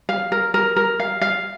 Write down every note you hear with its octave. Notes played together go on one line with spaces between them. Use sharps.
F5
A#4
A#4
A#4
F5
F5